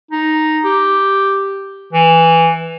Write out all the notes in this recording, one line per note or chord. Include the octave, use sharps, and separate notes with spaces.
D#4
G4
E3